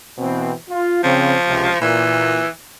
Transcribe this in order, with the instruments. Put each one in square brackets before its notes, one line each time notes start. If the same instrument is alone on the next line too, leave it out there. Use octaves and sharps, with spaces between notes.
[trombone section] B2 E3 C4
F4
[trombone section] C#3 C4 [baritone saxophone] F3
[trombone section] C#2 C3
[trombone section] A#2 [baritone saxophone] E3